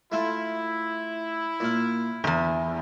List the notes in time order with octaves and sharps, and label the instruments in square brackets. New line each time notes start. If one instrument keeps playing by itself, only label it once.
[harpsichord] A3 F4 [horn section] E4
[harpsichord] A#2 F5
[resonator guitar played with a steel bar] E2 G#2 [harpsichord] A#4